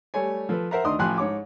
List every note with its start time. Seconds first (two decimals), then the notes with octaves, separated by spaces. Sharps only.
0.14 G3 A3 C#5 G#5
0.49 F3 A4 B4
0.71 A#4 C5 E5 F#5 A#5
0.84 D2 D#3 D4 D#5 C6 D#6
0.99 A1 F3 G5 G#5 C6 F#6
1.18 G#2 C#5 D6